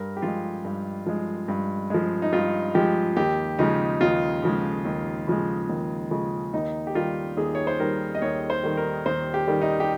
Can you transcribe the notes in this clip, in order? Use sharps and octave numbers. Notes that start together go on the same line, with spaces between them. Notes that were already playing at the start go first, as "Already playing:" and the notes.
Already playing: G2 A#4
G4
F3 G#3 F4
G2
F3 G#3
G2
F3 G#3
D#4
G2 F4
F3 G#3 G4
D#2 G4
C#3 F3 G#3 D#4
D#2 F4
C#3 F3 G#3
D#2
C#3 F3 G#3
D#2
C#3 F3 G#3
D#2 D#4
G4
D#3 G3 F4
D#2 G#4
C#5
C5
D#3 G3 A#4
D#5
D#2 C#5
C5
D#3 G3
A#4
D#2 C5
G4
D#3 G3
D#4
G4